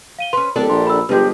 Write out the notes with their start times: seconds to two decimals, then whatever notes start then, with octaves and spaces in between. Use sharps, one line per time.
0.19 F5 D#7 G7
0.33 C#4 B4 C6
0.56 D1 G3 D4 A4 A#4
0.69 A#1 C6
0.87 B5 E6
1.09 G1 F3 G#3 G4 B4